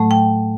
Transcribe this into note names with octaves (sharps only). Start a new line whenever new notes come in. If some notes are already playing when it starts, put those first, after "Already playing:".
Already playing: A2 F#3 A3
G5